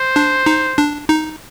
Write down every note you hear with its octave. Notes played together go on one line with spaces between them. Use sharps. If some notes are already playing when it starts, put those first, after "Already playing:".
Already playing: C5
D4
D#4
D4
D#4